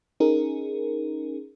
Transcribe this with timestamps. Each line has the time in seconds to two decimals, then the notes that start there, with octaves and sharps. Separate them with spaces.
0.20 C#4 D#4 G#4 A#4